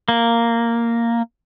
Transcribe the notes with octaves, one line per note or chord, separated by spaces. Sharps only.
A#3